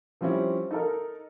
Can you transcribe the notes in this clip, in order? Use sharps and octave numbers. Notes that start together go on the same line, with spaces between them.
F3 G3 C4 C#4 E4
D#4 A4 A#4